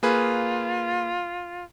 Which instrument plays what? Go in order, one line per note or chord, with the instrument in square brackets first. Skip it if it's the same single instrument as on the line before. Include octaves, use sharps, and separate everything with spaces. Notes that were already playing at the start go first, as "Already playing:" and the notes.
[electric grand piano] A#3 G#4 B4 [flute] F4